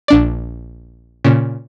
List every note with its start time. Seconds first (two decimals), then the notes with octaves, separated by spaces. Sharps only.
0.08 A#1 D4 D5
1.24 A#2 C#3